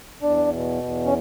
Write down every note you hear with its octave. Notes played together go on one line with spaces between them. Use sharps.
E2 D4
B2
E2
C#4